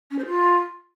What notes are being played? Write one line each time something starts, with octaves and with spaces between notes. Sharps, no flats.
C#4
C5
F4